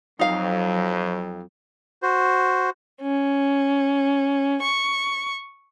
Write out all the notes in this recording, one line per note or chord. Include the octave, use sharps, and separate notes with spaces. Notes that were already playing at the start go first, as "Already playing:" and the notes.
F2 F#3 D#4 F5
F#4 C5
C#4
C#6